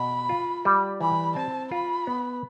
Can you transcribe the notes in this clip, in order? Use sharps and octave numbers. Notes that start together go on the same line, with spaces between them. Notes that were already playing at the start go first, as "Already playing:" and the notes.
Already playing: B2 B5
F4
G3
E3 B5
C4 A5
F4 B5
B3